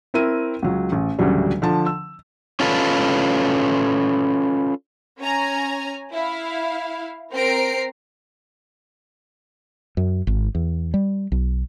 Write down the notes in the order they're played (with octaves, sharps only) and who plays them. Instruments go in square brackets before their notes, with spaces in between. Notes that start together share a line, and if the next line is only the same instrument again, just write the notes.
[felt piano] C4 E4 A#4 D#7
C#2 F#3
A1
A1 D2 C#3 F#3 G3
D3 F3 A5
E6
[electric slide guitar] C#4 F4 A4 B4
[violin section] C#4 G#5 A#5
E4 F5
C4 A#4 A#5 C7 D7
[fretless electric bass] F#2
G#1
E2
G3
B1